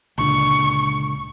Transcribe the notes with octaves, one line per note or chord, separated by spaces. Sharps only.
C#2 A#2 D3 C#6